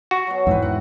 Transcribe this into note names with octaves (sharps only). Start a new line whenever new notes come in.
F#4
B2 F#3
E2 G#2 E3 C4 B4
F#5